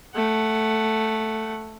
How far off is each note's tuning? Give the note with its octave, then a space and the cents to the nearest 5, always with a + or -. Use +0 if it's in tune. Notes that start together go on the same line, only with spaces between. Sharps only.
A3 +0 F#5 +10